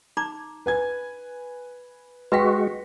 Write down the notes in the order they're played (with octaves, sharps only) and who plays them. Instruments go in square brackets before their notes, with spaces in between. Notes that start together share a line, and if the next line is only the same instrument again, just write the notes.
[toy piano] D#4 A#5 D6
[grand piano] B4 G#5 G#6
[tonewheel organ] G#3 F#4 [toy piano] B4 G5 [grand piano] C6 A#6 B6